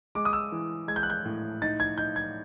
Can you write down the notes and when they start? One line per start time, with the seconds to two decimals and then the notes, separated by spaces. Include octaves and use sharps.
0.15 G#3 D6
0.25 D#6
0.33 E6
0.52 E3
0.88 G#3 G#6
0.96 G6
1.03 F#6
1.10 G6
1.25 A2
1.62 D#4 A6
1.80 G#6
1.98 D#4 G6
2.16 G#6